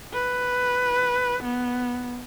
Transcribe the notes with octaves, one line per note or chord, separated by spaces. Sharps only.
B4
B3